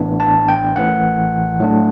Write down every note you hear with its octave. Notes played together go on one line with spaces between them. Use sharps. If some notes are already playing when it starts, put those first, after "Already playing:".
Already playing: A1 A2 E3 B3 D4
A5
G5
A1 A2 E3 F#5
A2 F#3 A3 D4